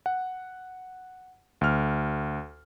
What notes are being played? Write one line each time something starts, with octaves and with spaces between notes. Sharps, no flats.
F#5
D2 F6